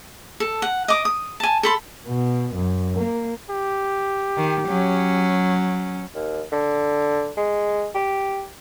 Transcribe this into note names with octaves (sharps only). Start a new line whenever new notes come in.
A4
F#5
D#5 D6
D#6
G#5 A5
A4 B5 C6
B2
F#2
A#3
G4
D#3
F#3 C#4
D#2
D3
G#3
G4